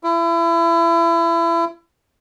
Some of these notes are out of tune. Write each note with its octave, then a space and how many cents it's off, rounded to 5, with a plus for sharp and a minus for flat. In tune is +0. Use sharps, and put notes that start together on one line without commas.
E4 +30